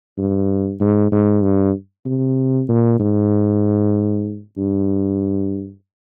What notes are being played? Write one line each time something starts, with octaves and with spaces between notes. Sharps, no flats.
G2
G#2
G#2
G2
C3
A#2
G#2
G2